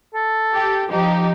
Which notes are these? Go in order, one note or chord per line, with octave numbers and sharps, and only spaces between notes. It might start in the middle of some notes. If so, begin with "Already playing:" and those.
A4
G4
F3 D#4 G4